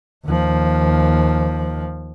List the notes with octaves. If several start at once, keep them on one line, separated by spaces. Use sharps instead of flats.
D#2 F3